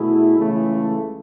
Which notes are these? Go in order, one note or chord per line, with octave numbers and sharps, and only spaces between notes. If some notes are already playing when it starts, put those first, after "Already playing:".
Already playing: B2 A3 E4 G#4
C#2 C#3 E3 A3